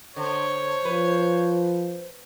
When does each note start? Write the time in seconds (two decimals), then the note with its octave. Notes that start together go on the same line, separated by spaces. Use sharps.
0.16 D3 C5 C#5
0.85 F3 B4